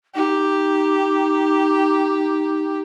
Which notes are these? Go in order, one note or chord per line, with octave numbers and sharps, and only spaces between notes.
D#4 G4